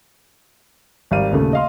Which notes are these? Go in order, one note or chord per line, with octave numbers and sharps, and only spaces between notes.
G#1 G3 F5 D#7
D#1 C#3 A3
D#5 F5 C6